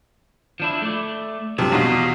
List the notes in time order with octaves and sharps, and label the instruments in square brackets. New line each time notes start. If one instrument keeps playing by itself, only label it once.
[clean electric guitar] F3 D4 E4
A3 D5
[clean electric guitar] G2 F#3 [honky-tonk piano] C3 F3
[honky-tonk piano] E2 B2 [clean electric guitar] F4 F#4